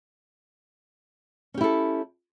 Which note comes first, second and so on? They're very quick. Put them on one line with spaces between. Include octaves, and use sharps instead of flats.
C#4 G4 E4 A4